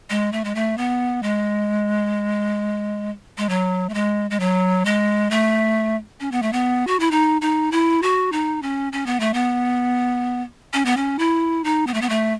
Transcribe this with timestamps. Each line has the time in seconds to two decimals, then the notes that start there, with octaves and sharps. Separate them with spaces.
0.10 G#3
0.32 A3
0.44 G#3
0.55 A3
0.78 B3
1.23 G#3
3.38 G#3
3.49 F#3
3.89 A3
3.94 G#3
4.31 G#3
4.40 F#3
4.85 G#3
5.31 A3
6.20 C#4
6.32 B3
6.42 A3
6.53 B3
6.87 F#4
7.00 E4
7.11 D#4
7.41 D#4
7.72 E4
8.02 F#4
8.32 D#4
8.62 C#4
8.93 C#4
9.06 B3
9.20 A3
9.34 B3
10.73 C#4
10.85 B3
10.97 C#4
11.19 E4
11.64 D#4
11.87 B3
11.94 A3
12.02 B3
12.09 A3